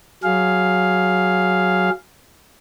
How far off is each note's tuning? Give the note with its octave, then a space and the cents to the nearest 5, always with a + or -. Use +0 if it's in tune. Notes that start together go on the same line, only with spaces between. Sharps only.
F#3 +0 G#4 +0 F5 +0